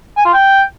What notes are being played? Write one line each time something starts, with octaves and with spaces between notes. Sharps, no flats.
G#5
F4
G5